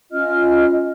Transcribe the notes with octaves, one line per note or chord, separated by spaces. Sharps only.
C#4 F4 D#5 F6